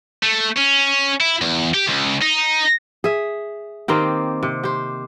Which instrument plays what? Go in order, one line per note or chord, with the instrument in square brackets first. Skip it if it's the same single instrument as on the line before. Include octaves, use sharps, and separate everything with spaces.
[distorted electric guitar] A3
C#4
E4
E2
G4
C#2
D#4
[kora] G#4 E5
D#3 A#3 C4 G4
C3
G4 C5